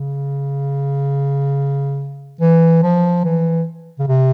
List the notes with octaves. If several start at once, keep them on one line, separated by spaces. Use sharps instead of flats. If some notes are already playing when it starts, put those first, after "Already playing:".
Already playing: C#3
E3
F3
E3
C#3
C3